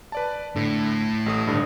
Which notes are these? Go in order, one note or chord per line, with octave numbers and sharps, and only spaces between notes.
B4 D5 A5
A2 D3
A1 A3 D#6
G#1 G2 D3